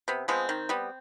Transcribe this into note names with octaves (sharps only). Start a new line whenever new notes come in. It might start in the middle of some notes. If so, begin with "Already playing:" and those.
C3 B3
F3 G#3 B3 C4
D#3
G3 B3